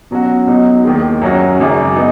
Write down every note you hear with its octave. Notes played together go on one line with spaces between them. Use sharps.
B2 F#3 C#4 F#4
B1 B2 F#3 D#4
D#2 D#3 G#3
F#2 F#3 C#4 F#4
G#1 F#2 C#3
B3 D#4